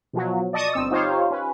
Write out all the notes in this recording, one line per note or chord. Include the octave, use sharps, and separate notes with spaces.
B2 F3 F#3
D5 D#5 A5 C#6 D#6
G1 C4 E6
D#4 F4 G4 C5 C#5 F5
C#4 B4